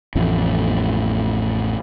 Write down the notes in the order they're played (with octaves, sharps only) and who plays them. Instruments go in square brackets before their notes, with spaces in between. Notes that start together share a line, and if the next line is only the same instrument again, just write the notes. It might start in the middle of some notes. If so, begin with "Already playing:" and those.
[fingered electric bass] A1 F2 A2